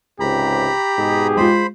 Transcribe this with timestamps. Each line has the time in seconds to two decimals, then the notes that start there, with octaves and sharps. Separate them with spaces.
0.20 C#2 G#2 C3 G4 A#5 B5
0.99 G#2 B2 G#4
1.37 G#3 F4 C5 B5